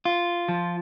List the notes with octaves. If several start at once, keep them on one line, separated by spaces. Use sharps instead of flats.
F4
F3